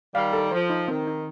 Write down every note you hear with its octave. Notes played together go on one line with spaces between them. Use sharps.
D#3 G3 F5
A4
F3 C5
D#4
D#3 C4
D#4